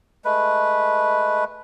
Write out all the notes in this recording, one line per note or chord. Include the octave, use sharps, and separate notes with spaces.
G#3 A3 B4